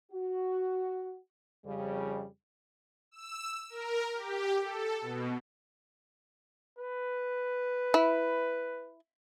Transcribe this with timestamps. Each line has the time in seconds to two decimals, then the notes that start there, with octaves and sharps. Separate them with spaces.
0.12 F#4
1.66 F2 C#3 G3
3.11 E6
3.70 A#4
4.14 G4
4.62 A4
5.01 B2
6.79 B4
7.94 E4